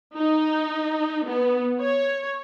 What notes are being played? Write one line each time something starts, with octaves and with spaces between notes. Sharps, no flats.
D#4
B3
C#5